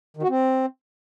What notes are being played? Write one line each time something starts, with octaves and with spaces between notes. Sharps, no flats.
D#3
F#4
C4